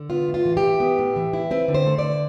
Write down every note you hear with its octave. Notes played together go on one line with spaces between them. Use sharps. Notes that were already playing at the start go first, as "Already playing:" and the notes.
Already playing: D3
B3 F4
A2
F4
E3
G4
E4
B3
A2
E3
E4
C4 B4
D3
C5
A3
D3 D5